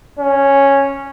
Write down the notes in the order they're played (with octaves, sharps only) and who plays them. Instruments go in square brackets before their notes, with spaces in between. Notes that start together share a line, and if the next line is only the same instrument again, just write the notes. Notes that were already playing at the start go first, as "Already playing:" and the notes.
[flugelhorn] C#4